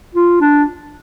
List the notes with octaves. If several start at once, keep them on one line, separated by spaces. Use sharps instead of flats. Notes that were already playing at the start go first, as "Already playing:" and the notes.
F4
D4